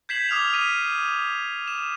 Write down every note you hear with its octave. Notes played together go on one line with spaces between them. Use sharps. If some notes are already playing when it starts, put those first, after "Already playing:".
G6 G#6 B6 C7 E7 F#7
D6 D#6 F6 G#6 F7
B6 D#7
E7